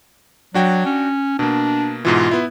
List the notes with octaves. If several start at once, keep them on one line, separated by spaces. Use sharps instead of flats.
F#3 D4 F#4 G5
C#4
B2 A#3 D4
G#2 B2 E3 F4
B3 E4